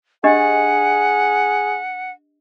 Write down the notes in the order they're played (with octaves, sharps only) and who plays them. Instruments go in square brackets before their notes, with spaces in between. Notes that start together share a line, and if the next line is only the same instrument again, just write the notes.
[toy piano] D4 G4 D#5 [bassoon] G#4 [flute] F#5